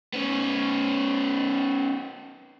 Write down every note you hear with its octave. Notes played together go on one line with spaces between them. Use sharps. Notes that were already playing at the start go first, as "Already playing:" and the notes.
B3 C#4